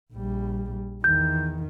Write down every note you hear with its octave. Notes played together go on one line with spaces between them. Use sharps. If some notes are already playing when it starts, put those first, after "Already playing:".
A#1 G3
E2 D#3 G6